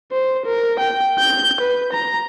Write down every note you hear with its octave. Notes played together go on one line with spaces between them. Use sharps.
C5
A#4
G5
G6
B4
A#5